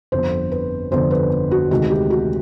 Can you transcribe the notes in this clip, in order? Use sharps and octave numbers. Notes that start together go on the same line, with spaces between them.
G1 F2 D3 C5
B4
G1 F2 D3 C5
B4
F#4
D2 C3 D#3 G#3 F#4
G4
F#4